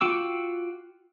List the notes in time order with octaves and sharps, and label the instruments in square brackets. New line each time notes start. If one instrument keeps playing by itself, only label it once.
[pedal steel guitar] F4 F#4 G5 D6 E6